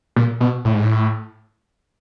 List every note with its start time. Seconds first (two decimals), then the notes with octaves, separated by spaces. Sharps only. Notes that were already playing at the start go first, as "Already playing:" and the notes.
0.16 A#2
0.41 B2
0.65 A2
0.74 G#2
0.83 A2